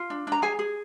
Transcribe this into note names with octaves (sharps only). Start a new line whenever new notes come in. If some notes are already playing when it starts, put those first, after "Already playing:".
Already playing: F4
D4
D4 A#5
G#4 G#5
G#4